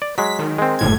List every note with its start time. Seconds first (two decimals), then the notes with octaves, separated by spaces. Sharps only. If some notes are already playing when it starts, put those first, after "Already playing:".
0.02 D5
0.18 F#3 G#3 B6
0.39 D#3
0.58 G#3 C4
0.79 G1 A2 G#6